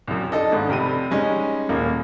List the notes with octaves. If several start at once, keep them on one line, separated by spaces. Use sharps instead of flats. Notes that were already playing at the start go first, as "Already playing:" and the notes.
C2 F#2
D4 D#4 A4 D#5
G#1 G#2
F1 C3 G5 B5 D#7
G3 G#3 C#4 D#4
D#1 A#3